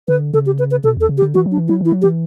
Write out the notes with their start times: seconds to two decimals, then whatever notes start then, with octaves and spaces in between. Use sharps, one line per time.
0.08 D3 B4
0.34 C#3 A4
0.46 G4
0.59 B4
0.71 B4
0.84 B2 A4
0.97 E2 A4
1.09 C#3
1.18 G4
1.22 D3
1.34 E3 F#4
1.46 F#3
1.51 D4
1.57 E3
1.68 F#3 E4
1.81 E3 E4
1.92 F#3
2.02 E3 G4